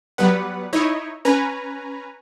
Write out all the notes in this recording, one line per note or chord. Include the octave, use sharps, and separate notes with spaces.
F#3 G3 B3 B4 F#5
D#4 E4 C#5 D#5
C#4 B4 G#5 A#5